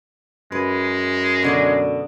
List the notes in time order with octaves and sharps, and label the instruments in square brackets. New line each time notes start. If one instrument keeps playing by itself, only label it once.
[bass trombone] F#2 [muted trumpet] G#3 [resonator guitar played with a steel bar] B4
[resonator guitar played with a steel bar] B2 D3 D4